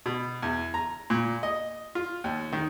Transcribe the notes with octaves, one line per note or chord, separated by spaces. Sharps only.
B2
E2
A#5
A#2
D#5
F4
D#2
D#3